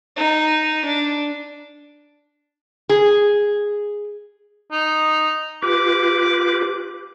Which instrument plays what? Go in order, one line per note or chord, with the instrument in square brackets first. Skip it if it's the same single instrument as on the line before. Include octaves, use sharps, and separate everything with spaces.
[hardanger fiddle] D#4
D4
[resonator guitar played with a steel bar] G#4
[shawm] D#4
[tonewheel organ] F4 G4 B4 [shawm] D6